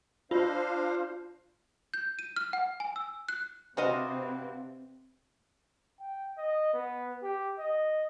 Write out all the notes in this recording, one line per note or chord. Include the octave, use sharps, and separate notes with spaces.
D4 F4 C5 F5
G6
D#7
F6
F#5
G#5
E6
F#6
C3 C4 D4 F#4 B4 C5 D#5 F5
G5
D#5
B3
G4
D#5